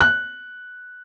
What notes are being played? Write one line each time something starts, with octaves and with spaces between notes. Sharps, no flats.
F#6